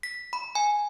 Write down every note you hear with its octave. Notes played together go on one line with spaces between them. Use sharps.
B6
B5
G#5